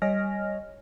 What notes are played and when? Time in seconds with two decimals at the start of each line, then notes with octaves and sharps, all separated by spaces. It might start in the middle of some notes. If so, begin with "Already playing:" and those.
0.02 G3 C#5 D#5 G#5 F6 A#6